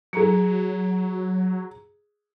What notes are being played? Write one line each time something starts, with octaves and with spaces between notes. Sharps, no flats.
F#3 G#4 A#5 C#7